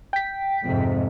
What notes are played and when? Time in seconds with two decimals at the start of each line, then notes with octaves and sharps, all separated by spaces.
0.13 G5 B6
0.65 F2 G#2 C3